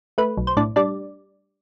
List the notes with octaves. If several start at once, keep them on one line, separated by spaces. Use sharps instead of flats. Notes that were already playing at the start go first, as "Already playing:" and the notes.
A3 B4
B1
C5
A2 D4 D5
G3 D4 D5